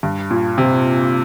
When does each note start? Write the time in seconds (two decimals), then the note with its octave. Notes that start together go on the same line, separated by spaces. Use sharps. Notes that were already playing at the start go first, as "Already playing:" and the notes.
0.03 G2
0.30 A#2
0.58 C3